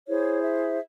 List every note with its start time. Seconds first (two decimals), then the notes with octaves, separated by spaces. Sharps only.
0.08 E4 G#4 C5 C#5
0.44 E5